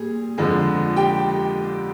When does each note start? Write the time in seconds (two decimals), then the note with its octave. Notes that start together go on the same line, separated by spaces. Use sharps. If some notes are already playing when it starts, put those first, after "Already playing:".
Already playing: A#2 G3 G#4
0.38 F2 D3 F3 G#3
0.96 G4 G5